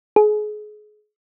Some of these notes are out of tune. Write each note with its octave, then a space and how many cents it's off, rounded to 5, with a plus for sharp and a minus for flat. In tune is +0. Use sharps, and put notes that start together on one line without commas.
G#4 +30